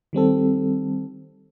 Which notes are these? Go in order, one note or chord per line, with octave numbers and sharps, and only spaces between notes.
D#3 G3 C4 A4